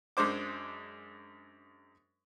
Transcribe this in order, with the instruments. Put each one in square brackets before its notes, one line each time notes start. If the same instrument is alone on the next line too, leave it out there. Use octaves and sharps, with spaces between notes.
[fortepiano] F#2 G#3 D4 C5 D6